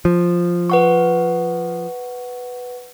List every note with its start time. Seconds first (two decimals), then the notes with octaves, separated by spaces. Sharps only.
0.05 F3
0.70 B4 F#5 C#6